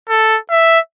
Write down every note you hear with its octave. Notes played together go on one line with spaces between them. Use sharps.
A4
E5